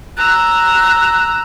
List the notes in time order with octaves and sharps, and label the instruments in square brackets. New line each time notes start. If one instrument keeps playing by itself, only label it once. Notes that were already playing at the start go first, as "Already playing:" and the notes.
[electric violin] A#5 E6 [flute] F#6